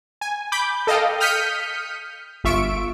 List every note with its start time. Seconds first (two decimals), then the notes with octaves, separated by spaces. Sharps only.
0.21 G#5
0.52 B5 D6 G6
0.87 A4 D#5 F5 G5
1.20 D#6 F6 G6 B6 C#7 D#7
2.44 G1 F4 E5 C#6 D7